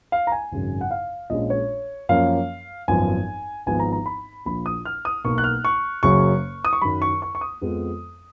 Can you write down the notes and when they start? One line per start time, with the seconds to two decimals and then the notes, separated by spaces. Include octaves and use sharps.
0.12 F5
0.27 A#5
0.32 G#5
0.52 G#1 F#2 C#3 F#3
0.81 F#5
0.91 F5
1.30 A#1 A#2 G#3 C#4 D#5
1.50 C#5
2.09 F#2 F3 A#3 C#4 F5
2.88 G#1 F#2 F3 B3 G#5
3.66 G#1 G#2 F3 B3 G#5
3.79 A#5
3.93 A#5
4.06 B5
4.45 A#1 A#2 F3 B5
4.66 D#6
4.85 F6
5.05 D#6
5.24 B1 B2 A#3 C#6
5.38 F#6
5.44 F6
5.65 C#6
6.03 F#1 F#2 C#3 F#3 C#4 C#6
6.65 D#6
6.73 C#6
6.82 F#2 D#3 F#3 B5
7.02 C#6
7.22 C#6
7.35 C#6
7.41 D#6
7.62 F2 F3 G#3 B3